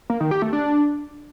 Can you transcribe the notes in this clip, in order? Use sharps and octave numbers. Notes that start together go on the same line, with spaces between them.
A#3
D#3
G4
A3
D4